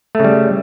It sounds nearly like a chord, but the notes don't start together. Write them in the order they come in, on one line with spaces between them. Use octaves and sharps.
A3 C#3 G3